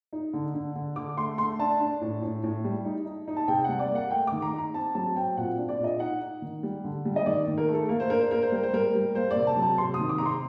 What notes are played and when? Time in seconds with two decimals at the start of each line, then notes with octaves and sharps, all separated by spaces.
0.13 D#4
0.33 D3
0.54 D3
0.75 D3
0.96 D3 D6
1.17 A3 C6
1.38 A3 C6
1.59 D4 A5
1.80 D4
2.01 A2
2.22 A2
2.43 A2
2.64 G3
2.85 D#4
3.06 D#4
3.28 D#4
3.37 A5
3.48 C3 G5
3.64 G3 F#5
3.79 D5
3.90 A#3
3.95 F#5
4.11 A3 G5
4.27 D#3 D6
4.42 A#5
4.53 D#4
4.58 A#5
4.74 C4 A5
4.95 F#3 A5
5.16 C4 G5
5.37 A#2 F#5
5.58 D4
5.69 D5
5.79 A#2
5.84 D#5
6.00 D#4 F#5
6.21 D#4
6.42 D#3
6.63 G3
6.84 D3
7.05 G3
7.16 D#5
7.26 D#3 D5
7.48 D#3
7.58 A#4
7.69 A3 A4
7.89 A#3 A#4
8.00 C5
8.10 D4 A#4
8.21 C5
8.31 A#3 A#4
8.42 C5
8.52 G3 A#4
8.63 C5
8.73 G3 A#4
8.94 G3
9.15 A#3 C5
9.31 D5
9.36 C3
9.47 A5
9.57 F#3
9.62 A5
9.78 C3 C6
9.94 D#6
9.99 D#3
10.09 D6
10.18 C3 A#5
10.26 C6